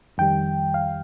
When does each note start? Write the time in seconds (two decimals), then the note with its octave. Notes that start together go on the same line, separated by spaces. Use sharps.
0.18 F2 D#3 G3 G5
0.74 F5